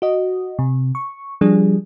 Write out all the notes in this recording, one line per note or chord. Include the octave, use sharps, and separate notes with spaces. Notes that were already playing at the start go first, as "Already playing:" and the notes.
F#4 D#5
C3
C#6
F3 G3 D4 G#4